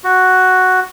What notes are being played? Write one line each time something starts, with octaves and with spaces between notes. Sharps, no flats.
F#4